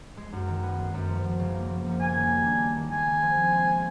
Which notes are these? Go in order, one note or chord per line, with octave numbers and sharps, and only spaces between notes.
G#3
F#2
D#3
B3
G#3
F#2
F3
F#2
C#3
A#3
F3
F#2
A#3 G#5
D#3
G3
D4
A#3
D#3
G#3 G#5
C#3
F3
C4
G#3
C#3